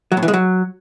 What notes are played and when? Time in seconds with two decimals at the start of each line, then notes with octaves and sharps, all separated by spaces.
0.12 F#3
0.17 A2
0.23 E3
0.28 G#3
0.33 F#3